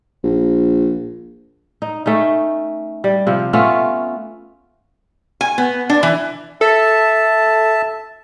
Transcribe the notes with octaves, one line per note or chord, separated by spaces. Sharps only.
A#1
D#4
A3 C#4 D#4
G3
C3 F3
A3 B3 C#4 F4
G#5
B3
D4
E3
A4 E5 A5